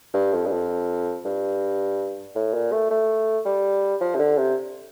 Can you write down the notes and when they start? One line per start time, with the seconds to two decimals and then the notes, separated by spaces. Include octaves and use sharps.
0.14 G2
0.33 F2
0.46 G2
0.51 F2
1.25 G2
2.35 A2
2.54 A#2
2.72 A3
2.91 A3
3.46 G3
4.01 F3
4.15 C3
4.19 D3
4.38 C3